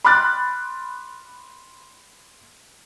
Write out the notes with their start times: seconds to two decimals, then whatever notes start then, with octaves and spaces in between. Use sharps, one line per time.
0.04 B5 C6 D6 F6 F#6 A6